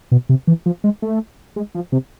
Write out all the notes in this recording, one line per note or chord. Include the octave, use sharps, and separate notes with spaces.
B2
C3
E3
F3
G#3
A3
G#3
F3
C3